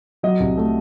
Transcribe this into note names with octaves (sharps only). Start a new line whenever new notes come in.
F#3 D#5
C2
A3